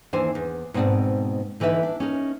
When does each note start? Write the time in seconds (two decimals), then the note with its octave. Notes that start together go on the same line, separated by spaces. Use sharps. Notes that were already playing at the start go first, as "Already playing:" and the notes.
0.13 D#2 E3 D4 C5 G#5
0.35 E2
0.74 G#2 B2 B3 C4 D5 A5
1.60 D3 E3 D#4 B4 E5
1.83 D4
2.00 C#4 D#4 A#4